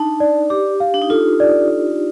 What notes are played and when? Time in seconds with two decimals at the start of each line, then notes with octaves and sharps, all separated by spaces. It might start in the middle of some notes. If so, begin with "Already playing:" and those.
Already playing: D4 D#4 A5
0.20 D5
0.50 G4 D6
0.80 F5
0.94 D4
1.02 D#4
1.10 F4 A4
1.40 D5
1.70 D5